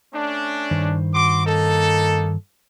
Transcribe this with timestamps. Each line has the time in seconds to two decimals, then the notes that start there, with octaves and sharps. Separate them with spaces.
0.14 A3 C#4 D4
0.71 G2 D#3 C5
1.14 F#4 C6 D6
1.46 A#3 D#4 A4